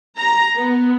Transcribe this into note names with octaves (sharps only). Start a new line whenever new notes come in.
A#5
B3